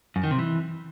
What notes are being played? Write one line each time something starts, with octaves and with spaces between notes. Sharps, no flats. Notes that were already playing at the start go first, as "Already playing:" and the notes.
F#2
D#3
C3
E3